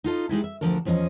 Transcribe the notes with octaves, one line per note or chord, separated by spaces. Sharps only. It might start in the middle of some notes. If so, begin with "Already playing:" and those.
D#4 F4 A4 D#5
G3 G#3 D#4 E4
E5
D2 A#2 F3 D4 A4 A#4
E2 F3 C#4 A#4 D#5